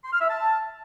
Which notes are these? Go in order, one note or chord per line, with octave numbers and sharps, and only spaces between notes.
C6
F6
E5
A5